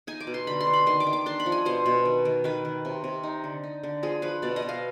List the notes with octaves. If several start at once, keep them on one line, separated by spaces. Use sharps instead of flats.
D#4 G#5
D6
B2
C6
D3 B5
C6
D3
B5
D#3 C6
D6
D#3
D6
D4 C6
B5
F3
G#5
B2 C5
B2
D#3
D#3
D#3 B4
D#3
C3
C3
D#4
D3
D#4
D3
F3 G#4
F3 B4
B2 D5
D#5
B2
F5